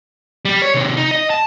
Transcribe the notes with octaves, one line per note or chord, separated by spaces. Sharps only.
G3
C#5
C3 D#3
D#4
D#5
A5